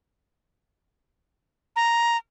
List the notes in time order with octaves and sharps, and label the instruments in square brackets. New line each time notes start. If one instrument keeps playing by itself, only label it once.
[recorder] A#5